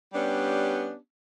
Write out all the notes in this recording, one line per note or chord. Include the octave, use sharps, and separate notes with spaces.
G3 B3 C#4 D4 G4